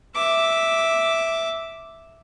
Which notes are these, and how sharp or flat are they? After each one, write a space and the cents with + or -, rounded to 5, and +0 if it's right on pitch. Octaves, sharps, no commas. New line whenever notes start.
E5 -5 D6 +0